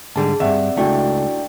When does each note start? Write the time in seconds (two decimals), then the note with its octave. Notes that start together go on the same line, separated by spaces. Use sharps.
0.16 G#2 D3 G3 G#4 A5
0.40 D2 G2 C4 D5 E5 F#5
0.77 C#2 A3 D4 E4 F#4 E5 G5